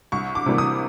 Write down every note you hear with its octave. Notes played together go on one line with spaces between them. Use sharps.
C2 C#6
D6
C3 E3 G3 A#3
D#6